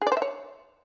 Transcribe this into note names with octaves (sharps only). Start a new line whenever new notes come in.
G#4
D5
C5
E5
C#5